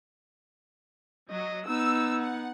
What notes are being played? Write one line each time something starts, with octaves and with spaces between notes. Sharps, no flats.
F#3 D#5
B3 D#4 E6
F#5